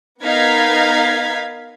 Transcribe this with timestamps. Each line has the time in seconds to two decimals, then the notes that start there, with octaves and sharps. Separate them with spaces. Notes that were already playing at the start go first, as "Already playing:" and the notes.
0.22 B3 D#4 A#4 F5 G#6 B6